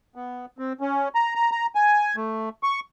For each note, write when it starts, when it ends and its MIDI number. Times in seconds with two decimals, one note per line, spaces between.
0.16 0.46 59
0.58 0.73 60
0.81 1.09 61
1.15 1.35 82
1.35 1.51 82
1.51 1.66 82
1.75 2.16 80
2.16 2.49 57
2.63 2.80 85